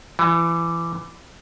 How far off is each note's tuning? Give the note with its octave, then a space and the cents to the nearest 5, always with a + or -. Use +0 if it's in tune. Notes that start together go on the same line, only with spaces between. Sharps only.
E3 +25